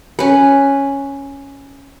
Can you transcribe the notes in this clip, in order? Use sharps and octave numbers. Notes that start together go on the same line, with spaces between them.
C#4 B4